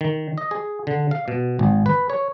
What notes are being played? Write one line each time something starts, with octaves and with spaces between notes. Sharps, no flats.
D#3
D#5
G#4
D3
F5
B2
G#1
B4
C#5